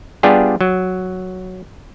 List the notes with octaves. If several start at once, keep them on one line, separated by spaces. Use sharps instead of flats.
G3 B3 D4 F4 G4 G#4
F#3